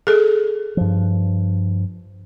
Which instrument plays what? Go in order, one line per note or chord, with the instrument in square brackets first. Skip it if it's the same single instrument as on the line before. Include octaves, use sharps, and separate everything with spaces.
[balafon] G#4 A4
[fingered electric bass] G2 F3